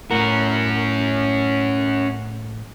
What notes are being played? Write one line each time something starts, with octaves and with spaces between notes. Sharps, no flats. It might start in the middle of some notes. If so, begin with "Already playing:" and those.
A2 C#4 F#4 A#4